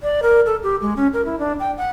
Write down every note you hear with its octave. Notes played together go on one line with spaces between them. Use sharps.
D5
A#4
A4
G4
G#3
C#4
A#4
E4
D4
G5
F#5